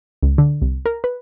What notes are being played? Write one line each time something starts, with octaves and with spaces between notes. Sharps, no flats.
C#2
D3
C2
A#4
B4